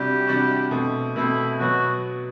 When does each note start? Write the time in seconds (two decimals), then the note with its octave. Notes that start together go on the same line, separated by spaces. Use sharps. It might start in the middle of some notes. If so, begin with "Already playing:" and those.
Already playing: C3 G3 D4 F#4 G4
0.27 C3 G3 D4 F#4
0.71 B2 A3 C4
1.16 B2 A3 C4 E4
1.59 B2 F#3 B3 F#4